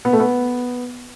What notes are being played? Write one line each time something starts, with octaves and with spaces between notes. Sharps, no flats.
B3
A3
B3